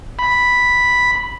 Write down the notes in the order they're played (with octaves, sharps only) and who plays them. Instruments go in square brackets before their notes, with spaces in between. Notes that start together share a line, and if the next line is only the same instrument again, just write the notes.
[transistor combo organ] B5